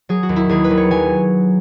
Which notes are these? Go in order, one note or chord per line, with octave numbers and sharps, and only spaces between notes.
F#3 G#4
F#4
D#2
E4
D#2 G#4
B4
F#3
C#5
F#3 G#5